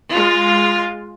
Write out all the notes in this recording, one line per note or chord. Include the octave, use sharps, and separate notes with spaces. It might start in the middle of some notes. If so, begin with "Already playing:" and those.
G#3 F4